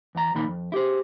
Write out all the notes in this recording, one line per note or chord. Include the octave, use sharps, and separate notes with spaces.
E2 A#5
D#2 A#2 D#3 B5
F2
E4 G4 G#4 C5